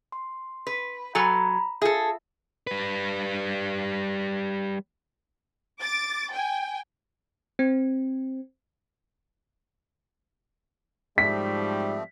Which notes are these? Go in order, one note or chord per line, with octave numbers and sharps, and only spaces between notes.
C6
B4
F#3 A4 G#5 A#5 B5
F4 G#4 A4 E5
G3 B4
D6 A6
G5 G#5
C4
G#2 F3 G3 A3 C4 B6